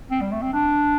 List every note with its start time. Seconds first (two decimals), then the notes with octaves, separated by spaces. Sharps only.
0.11 C4
0.21 G3
0.32 A3
0.42 C4
0.53 D4